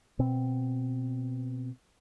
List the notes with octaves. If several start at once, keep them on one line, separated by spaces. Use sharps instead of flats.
B2 C4